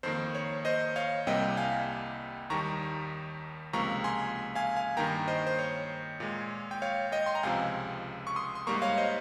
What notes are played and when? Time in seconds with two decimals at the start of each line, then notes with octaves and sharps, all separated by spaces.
0.03 F2 D#3 A#3 C5
0.35 C#5
0.65 C5 D#5
0.96 C#5 F5
1.27 C2 C3 G3 A#3 D#5 G5
1.57 F5 G#5
2.50 D#2 D#3 G3 A#5 C#6
3.73 C#2 C3 F3 A#3 A#5 C#6
4.04 G#5 C6
4.55 F5 G#5
4.76 F5 G#5
4.97 G2 D#3 A#3 G5 A#5
5.28 C5 D#5
5.47 C5
5.59 C#5
6.20 A#2 G#3
6.71 G5
6.82 C#5 F5
7.12 D#5 G5
7.26 C6
7.35 A#5
7.43 C#2 C3 F3 F5 G#5
8.27 C#6
8.36 C6 D#6
8.55 C6
8.67 G#2 G3 A#3 A#5 C#6
8.82 C#5 F5
8.97 C5 D#5